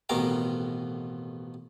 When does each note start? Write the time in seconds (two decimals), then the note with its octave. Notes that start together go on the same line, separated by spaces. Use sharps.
0.09 A1 F2 B2 D#3 A#5 D6